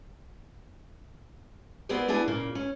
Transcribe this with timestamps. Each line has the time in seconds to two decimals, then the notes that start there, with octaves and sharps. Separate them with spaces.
1.89 B3 C4 G#4 A#4 C5 D5
2.08 B3 D4 E4 G#4 G#5
2.28 A#2 C#3 A#3
2.55 C#4